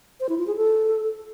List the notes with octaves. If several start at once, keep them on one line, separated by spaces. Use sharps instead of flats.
C5
E4
F4
G#4
A4